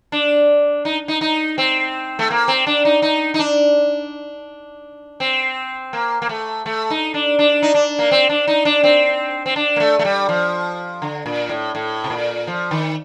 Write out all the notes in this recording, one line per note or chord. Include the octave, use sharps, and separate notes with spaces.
D4
D#4
D#4
D#4
C4
A3
A#3
C4
D4
D#4
D#4
D#4
D4
C4
A#3
A#3
A3
A3
D#4
D4
D4
D#4
D4
A#3
C4
D4
D#4
D4
C4
C4
D4
A#3
A3
A3
G3
F3
D3
A#2
A2
A2
C3
A#2
F3
D#3